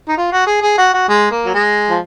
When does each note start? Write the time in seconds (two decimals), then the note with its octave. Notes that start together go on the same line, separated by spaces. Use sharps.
0.08 D#4
0.17 F4
0.32 F#4
0.47 G#4
0.62 G#4
0.78 F#4
0.93 F#4
1.09 G#3
1.31 A#3
1.45 F#3
1.54 G#3
1.90 F3